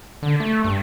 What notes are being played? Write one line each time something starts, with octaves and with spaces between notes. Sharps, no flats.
D3
A3
G2